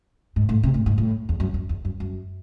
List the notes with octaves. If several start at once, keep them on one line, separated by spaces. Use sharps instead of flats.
G#2
A2
C3
A2
G#2
A2
E2
F#2
F#2
E2
F#2
F#2